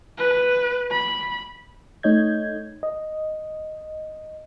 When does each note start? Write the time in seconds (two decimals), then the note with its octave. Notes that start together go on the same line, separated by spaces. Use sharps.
0.18 B4
0.91 B5
2.03 A3 D#4 C#5 D#5 G6 G#6
2.83 D#5